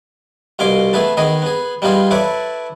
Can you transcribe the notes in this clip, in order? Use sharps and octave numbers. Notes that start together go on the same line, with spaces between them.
C2 B2 F5 G#5 C6 D6
A3 B3 G#4 B4 A5
D#3 B3 G#4 D#5
B3 G#4
G3 B3 D#4 F4 G#4
E4 A4 B4 C#5 D5